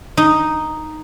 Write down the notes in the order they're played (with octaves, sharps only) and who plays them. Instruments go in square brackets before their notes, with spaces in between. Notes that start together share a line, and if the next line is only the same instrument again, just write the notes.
[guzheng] D#4